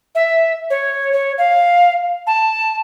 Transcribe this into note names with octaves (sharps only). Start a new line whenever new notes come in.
E5
C#5
C#5
F5
A5